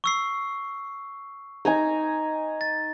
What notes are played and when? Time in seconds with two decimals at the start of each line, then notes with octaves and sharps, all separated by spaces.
0.04 C#6 E6 C7
1.65 D#4 G#5 A#5
2.61 A6